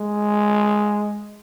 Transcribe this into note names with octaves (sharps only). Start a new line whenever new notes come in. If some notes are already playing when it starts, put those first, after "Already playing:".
Already playing: G#3